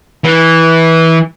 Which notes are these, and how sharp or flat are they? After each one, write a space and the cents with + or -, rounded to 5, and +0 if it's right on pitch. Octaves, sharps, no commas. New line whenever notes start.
E3 -15